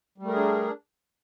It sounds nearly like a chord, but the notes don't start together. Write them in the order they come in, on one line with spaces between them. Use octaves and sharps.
G3 A3 A#4 G#4 D4